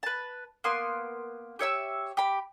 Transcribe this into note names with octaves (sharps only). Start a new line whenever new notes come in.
B4 A5
A#3 B3 C6
G4 C#5 E5 E6
G4 B5